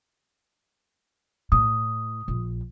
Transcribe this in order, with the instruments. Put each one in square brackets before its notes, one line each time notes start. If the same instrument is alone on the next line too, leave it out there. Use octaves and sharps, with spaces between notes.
[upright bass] A2 [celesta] D#6
[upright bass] A#1